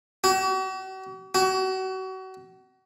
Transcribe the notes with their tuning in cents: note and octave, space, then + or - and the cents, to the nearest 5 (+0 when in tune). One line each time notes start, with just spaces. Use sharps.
F#4 +45
F#4 +35